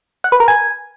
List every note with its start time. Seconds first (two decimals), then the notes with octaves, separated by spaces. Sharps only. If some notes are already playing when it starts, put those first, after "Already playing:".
0.24 F#5
0.32 B4
0.40 A#4
0.48 G#5